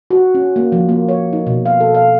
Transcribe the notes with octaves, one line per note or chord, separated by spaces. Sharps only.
F#4
C#4
A#3
F3
A#3
C#5
D#4
B2
F5
A4
F5